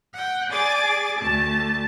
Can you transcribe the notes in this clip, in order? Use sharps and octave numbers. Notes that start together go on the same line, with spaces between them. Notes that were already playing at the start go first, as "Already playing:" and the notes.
F#5 G5
G#4 D5 G#5 D6 A6
D2 A3 A5